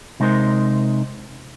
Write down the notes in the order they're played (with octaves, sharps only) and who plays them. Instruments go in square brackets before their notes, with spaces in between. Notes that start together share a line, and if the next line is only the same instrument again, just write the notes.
[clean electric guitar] C3 G#3 D#4 A#4 C5